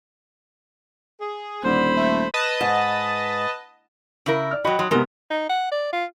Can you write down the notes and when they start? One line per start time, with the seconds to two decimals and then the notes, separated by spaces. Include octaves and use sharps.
1.20 G#4
1.64 D#1 D3 C5 B5
1.97 A3
2.34 B4 D#5 A5
2.61 G#2
4.26 C#3 E4 A#4
4.51 D5 F6
4.65 F#3 F#4 D#5 G5 B5
4.79 F#3 C6 D#6
4.91 C3 G#3 B3 A#4
5.30 D#4
5.49 F#5
5.71 D5
5.92 F4